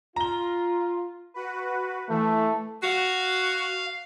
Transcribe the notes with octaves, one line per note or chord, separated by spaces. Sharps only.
F4 A#5 G7
F#4 B4
E3 A3
F#4 F5